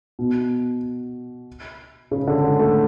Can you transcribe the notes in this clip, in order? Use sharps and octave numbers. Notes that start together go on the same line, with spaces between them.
B2
C#3
D3
G#3
A3